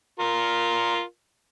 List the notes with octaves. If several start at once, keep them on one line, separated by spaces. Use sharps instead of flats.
F4 A#4